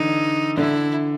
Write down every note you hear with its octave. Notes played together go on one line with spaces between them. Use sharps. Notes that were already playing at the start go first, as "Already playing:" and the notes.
Already playing: D3 E3 D#4
D3 E4